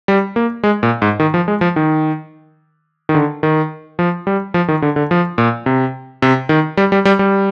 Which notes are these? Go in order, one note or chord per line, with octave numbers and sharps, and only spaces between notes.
G3
A#3
G#3
A#2
G#2
D#3
F3
G#3
F3
D#3
D#3
D3
D#3
F3
G3
F3
D#3
D3
D3
F3
A#2
C3
C3
D#3
G3
G3
G3
G3